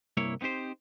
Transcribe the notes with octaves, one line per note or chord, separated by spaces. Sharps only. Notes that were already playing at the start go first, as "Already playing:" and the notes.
C2 G2 A#3 E4 C#5
B3 C4 D#4 G4 C5